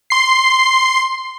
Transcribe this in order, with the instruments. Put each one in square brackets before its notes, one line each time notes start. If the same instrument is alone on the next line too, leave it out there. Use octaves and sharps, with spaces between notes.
[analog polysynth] C6 C7